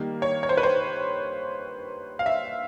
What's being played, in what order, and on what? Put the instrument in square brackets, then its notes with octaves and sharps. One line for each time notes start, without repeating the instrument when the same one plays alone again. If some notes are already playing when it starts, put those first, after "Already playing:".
Already playing: [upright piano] D#3 G3 A#3
C#5
C#5
C5
B4
C5
F5
E5